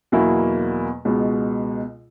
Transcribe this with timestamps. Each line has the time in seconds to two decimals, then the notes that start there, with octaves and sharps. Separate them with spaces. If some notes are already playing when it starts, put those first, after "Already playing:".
0.12 E2 B2 F#3 A#3 E4
1.05 C#2 B2 G#3